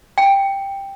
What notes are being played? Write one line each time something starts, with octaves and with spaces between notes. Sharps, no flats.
G5